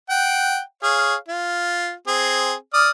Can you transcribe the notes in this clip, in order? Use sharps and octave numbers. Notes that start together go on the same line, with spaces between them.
F#5 G5
G#4 C#5 F5
F4
C4 G#4
D5 D#6 F6